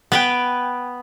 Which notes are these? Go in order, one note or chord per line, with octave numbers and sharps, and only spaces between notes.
B3 B4 G5